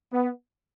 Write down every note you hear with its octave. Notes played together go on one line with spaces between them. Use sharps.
B3